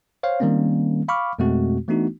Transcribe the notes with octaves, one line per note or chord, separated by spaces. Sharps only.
C5 C#5 F5
D#3 G3 A#3 C4 C#4
F5 B5 C#6 D6 F6
F2 B2 G#3 A3 C4 F#4
E3 A3 B3 D4 D#4 F#4